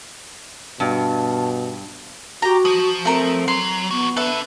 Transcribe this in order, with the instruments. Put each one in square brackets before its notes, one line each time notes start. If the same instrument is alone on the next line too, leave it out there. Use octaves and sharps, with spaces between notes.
[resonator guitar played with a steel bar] G2 [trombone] B2 [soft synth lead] A5
[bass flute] F#4 [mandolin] G4 A#5
[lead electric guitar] F3 [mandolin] D#6
[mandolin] A3 A#4 [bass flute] C4
[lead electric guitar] F#3 [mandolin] C6
[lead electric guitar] E2 F#4 [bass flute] B3
[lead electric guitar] D4 A4 [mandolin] B4 E5